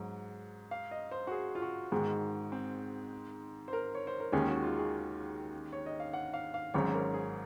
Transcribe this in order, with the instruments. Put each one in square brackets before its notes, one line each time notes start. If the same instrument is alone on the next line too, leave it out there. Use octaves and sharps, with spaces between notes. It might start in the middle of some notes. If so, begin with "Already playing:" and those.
Already playing: [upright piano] G#2 F#3
[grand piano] F5
D#5
C5
F#4
G#4
F4
F#4
[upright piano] G#2 D#3 G#3
[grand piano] C4
C5
A#4
C#5
C5
A#4
[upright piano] D#2 D#3 G#3 C#4 [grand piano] G#4
[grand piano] F#4
F4
G#4
C#5
D#5
F5
F#5
F5
F5
[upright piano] G#1 G#2 F#3 C#4 [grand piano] C#5
[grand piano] A#4
G#4